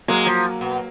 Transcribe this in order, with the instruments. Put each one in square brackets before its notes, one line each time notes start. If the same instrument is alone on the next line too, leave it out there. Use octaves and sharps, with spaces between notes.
[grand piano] F#3 A#3 [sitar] G#3
[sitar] F3
B2